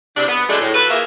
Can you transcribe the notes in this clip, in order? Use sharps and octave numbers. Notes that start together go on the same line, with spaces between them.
E2 C3 D4
B3
D3 F#3 G#3 A3 D4
A2
F3 F#4 A4 B4
E3 A#3 F4 G#4 A#4 E5